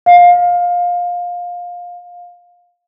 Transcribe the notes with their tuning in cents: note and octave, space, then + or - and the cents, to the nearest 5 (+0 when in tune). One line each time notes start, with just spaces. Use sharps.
F5 +20